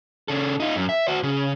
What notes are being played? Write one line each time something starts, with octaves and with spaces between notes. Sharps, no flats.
C#3 A4
D#4 F4
F#2
E5
F#4 C5
C#3